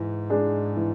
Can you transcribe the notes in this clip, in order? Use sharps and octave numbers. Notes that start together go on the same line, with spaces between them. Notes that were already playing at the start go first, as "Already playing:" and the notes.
Already playing: G#2 E3
G#3 D4 G#4
E3